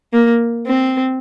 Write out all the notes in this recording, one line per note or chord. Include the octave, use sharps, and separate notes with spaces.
A#3
C4